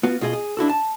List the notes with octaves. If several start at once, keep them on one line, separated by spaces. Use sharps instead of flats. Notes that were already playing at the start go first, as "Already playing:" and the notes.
B3 F4 F#4
B2 F4 G#4 D#5
G#4
D4 E4 F#4 A4
A5